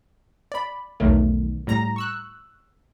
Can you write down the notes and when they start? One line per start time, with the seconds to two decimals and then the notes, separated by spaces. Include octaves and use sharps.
0.52 D5 B5
1.00 B1 E2 D#3 F#3 A3
1.67 A2 G3 A#5 A#6
1.96 C#6 E6 F#6